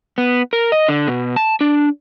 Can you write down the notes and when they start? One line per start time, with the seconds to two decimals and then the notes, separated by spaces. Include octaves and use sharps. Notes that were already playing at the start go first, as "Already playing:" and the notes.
0.18 B3
0.53 A#4
0.72 D#5
0.88 D3
1.08 B2
1.36 A5
1.61 D4